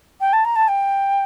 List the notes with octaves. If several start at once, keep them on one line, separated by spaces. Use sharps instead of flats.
G5
A5
A#5
A5
G5